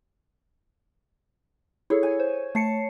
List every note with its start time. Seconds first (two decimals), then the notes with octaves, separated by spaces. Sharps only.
1.90 E4 G#4 A4 C#5
2.03 G#5
2.20 C5
2.55 A3 A5 C7 C#7